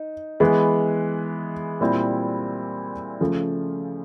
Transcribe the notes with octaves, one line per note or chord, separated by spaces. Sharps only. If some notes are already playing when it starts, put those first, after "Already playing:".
Already playing: D#4
E3 G#3 B3
A#2 G3 C4 E4
C#3 F3 A3